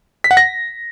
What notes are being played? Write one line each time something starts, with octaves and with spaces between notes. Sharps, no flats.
B6
F#5
A#6